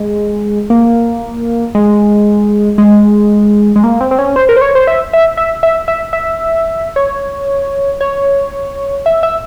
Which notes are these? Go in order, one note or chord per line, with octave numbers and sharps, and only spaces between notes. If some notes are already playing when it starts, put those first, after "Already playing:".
Already playing: G#3
A#3
G#3
G#3
G#3
A#3
C4
C4
C#4
C5
A#4
C5
C#5
C5
E5
E5
E5
E5
E5
E5
C#5
C#5
E5
E5